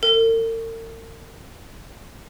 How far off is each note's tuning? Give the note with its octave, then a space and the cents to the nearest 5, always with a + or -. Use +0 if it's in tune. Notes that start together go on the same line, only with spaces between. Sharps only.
A#4 -45